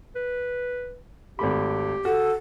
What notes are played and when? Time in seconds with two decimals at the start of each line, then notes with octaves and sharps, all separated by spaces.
0.16 B4
1.39 G#1 A3 G4 B5
2.05 F#4 A4